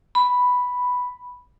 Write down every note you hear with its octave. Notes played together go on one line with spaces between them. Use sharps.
B5